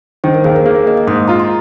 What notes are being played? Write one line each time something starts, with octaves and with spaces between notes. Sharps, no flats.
D#3 C5
A#4
D#2 G#4
A#4
A#3 G#4
A#4
A#3 D#5
D#5
G#2 D#6
F4 A#5
C6